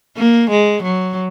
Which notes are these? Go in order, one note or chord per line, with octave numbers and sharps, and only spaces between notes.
A#3
G#3
F#3